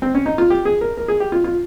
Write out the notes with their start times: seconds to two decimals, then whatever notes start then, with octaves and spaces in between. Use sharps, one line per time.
0.02 C4
0.15 C#4
0.26 D#4
0.38 F4
0.50 G4
0.65 G#4
0.81 A#4
0.97 A#4
1.08 G#4
1.20 G4
1.32 F4
1.44 F4